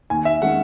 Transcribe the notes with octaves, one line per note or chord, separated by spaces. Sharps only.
D#2 G#5
E5
D#3 G#3 C#4 F#5